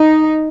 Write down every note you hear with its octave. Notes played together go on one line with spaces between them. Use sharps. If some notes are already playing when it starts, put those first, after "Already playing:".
Already playing: D#4